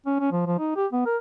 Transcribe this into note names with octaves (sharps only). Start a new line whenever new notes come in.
C#4
C#4
F3
F3
D#4
G4
B3
A#4